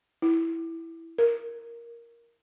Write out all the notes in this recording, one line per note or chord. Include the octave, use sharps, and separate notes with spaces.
E4
A#4